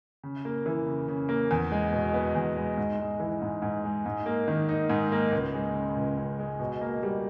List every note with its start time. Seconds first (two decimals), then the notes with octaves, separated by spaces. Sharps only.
0.24 C#3
0.45 A#3
0.66 E3
0.86 C#3
1.08 C#3
1.29 A#3
1.51 E2
1.72 G#3
1.92 B2
2.14 B3
2.35 E2
2.56 G#3
2.77 G#2
2.99 G#3
3.20 E3
3.42 G#2
3.62 G#2
3.84 G#3
4.06 G#2
4.26 A#3
4.48 D#3
4.69 D#4
4.90 G#2
5.12 A#3
5.32 C#2
5.54 G#3
5.74 C#3
5.96 C#2
6.17 C#2
6.39 G#3
6.60 B2
6.81 A#3
7.03 G3